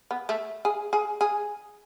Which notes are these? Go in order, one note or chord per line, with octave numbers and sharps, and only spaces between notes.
B3
A3
G#4
G#4
G#4